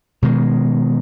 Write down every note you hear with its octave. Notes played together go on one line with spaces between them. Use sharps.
B2 D#3 G#3